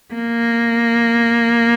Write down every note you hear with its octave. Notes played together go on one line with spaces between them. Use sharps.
A#3